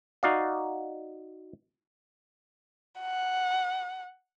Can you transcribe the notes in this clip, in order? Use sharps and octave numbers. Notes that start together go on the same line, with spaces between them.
D#4 F#4 D5 F5
F#5